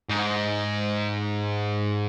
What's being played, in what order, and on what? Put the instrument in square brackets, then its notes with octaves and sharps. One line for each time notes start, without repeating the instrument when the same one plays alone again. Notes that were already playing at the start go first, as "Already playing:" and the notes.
[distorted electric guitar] G#2